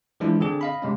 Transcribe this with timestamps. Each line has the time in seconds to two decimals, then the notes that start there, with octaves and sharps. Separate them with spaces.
0.20 E3 F3 G#3 D4 E4 F4
0.40 D3 C4 D4 G#4
0.61 D#5 F5 B5
0.82 C3 G#3 C#4